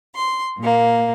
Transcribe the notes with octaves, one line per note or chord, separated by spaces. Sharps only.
C6
A#2 A#3